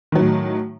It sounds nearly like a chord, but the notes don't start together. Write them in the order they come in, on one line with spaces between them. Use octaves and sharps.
D#3 F#3 A2